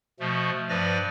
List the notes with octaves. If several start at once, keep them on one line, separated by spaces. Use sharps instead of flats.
B2 F3 A3
G2 F3 B4 D5 A#6